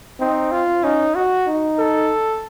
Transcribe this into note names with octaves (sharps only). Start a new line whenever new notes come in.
C4 D#4
F4
C#4 D#4
F#4
D#4
A4